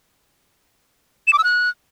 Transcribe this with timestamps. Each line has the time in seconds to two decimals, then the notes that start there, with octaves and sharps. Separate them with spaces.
1.27 E7
1.33 D6
1.38 E6
1.44 F#6